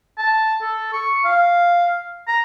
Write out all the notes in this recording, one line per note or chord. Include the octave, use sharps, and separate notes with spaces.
A5
A4
C#6
F5
A#5